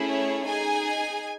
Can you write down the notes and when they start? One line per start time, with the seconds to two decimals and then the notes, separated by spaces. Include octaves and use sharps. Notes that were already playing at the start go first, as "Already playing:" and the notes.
Already playing: A3 C#4 E4 G#4
0.09 C#5
0.47 D#4 G#4 G#5